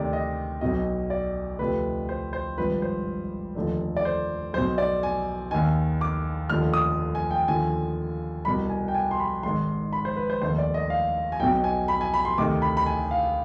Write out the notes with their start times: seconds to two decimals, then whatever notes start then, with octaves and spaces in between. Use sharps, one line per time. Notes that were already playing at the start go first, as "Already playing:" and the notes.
Already playing: D2 C3 D#3 D5
0.13 D#5
0.61 B1 B2 D#5
1.10 D5
1.59 D2 C3 F3 B4
2.09 C5
2.33 C5
2.58 G#1 G2 F3 B4
2.82 C5
3.55 F1 D#2 D3 F3
3.97 D5
4.05 C5
4.53 B1 C5
4.58 B2
4.78 D5
5.03 G#5
5.51 D#2 D#3 G#5
6.01 D6
6.49 F1 D#2 D3 F3 F6
6.74 D#6
7.15 G#5
7.31 G5
7.48 D#2 D3 F3 G#5
8.45 C2 B2 B5
8.70 G#5
8.88 G5
8.95 G#5
9.11 C6
9.20 B5
9.43 G#1 G#2 D#3 C6
9.93 B5
10.05 C5
10.16 B4
10.30 C5
10.41 F1 D#2 D#3 C5
10.58 D5
10.74 D#5
10.90 F5
11.32 G#5
11.40 B1 B2 G5
11.64 G#5
11.88 B5
12.01 G#5
12.14 B5
12.25 C6
12.38 D2 C3 D#3 D6
12.62 B5
12.77 B5
12.86 G#5
13.11 F5